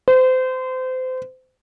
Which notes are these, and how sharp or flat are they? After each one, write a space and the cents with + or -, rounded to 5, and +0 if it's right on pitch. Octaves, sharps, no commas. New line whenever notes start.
C5 -30